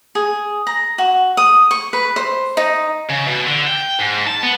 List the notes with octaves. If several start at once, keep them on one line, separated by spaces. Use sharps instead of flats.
G#4
A#5
F#4
D#6
C#6
B4
C5
D#4
C#3
B2
D3
G5
G#2
A5
B3